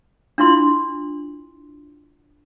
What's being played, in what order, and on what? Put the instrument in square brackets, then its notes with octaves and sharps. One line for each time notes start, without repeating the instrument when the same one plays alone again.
[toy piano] D4 E4 F4 C6